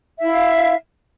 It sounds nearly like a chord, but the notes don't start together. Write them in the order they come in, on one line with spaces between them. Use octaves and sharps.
E5 E4 F5